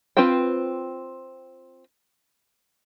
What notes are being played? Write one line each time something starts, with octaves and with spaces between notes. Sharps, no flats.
C4 F4 B4 C5 G5